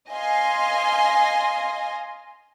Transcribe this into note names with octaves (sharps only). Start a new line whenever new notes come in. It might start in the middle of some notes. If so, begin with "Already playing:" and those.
D#5 F5 G#5 C6